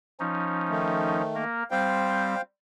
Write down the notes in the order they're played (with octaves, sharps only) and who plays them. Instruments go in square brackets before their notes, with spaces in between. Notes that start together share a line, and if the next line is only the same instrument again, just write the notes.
[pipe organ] F3 C#4 D#4
[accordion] D#3 A3
[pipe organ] A#3 A#4
[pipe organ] G3 C4 [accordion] C5 F5 G5